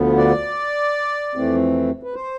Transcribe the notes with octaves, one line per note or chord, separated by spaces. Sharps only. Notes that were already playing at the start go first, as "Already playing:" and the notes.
Already playing: D2 D3 F3 B3
D5
F2 E3 A3 C4
B4
C5